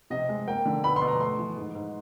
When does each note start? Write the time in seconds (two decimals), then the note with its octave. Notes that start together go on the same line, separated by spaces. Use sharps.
0.10 C3 D#5
0.29 G#3
0.47 A#3 G5
0.66 D3
0.84 B2 B5
0.96 C6
1.01 B2
1.08 A#5
1.20 A3 C6
1.38 E3
1.57 G#2
1.75 G#2